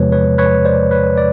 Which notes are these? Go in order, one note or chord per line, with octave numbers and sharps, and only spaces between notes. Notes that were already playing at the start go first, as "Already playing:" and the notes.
Already playing: E2 C3 F3 G#3 B4 C#5
B4 C#5
B4 C#5
C5 D5
B4 C#5
D5